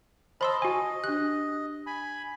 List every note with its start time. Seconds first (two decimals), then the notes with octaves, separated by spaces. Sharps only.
0.41 C5 D#5 A5 B5 C6 E6
0.62 F#4 D#5 G#5
1.04 D4 G4 F#6
1.87 G#5 B5